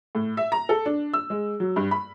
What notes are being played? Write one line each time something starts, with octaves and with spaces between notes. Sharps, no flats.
A2
E5
A#5
A4
D4
E6
G#3
F#3
G2
B5